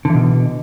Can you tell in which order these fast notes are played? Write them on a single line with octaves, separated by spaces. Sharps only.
D3 E3 B2